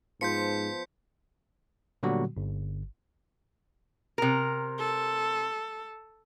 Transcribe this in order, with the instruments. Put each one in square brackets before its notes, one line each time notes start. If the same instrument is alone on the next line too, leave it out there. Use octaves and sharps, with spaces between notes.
[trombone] G#2 [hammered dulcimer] F3 B3 C5 [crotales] G6 B6 C#7
[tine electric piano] A#2 D3 F#3 G3 B3 F#4
G1
[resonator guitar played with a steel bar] C3 A#4
[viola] A4